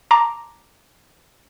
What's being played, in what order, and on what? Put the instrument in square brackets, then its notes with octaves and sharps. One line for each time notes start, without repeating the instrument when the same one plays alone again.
[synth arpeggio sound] A5 A#5 C6 D6